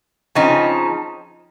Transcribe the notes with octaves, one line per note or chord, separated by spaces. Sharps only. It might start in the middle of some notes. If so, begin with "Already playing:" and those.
C#3 F3 C4 D#4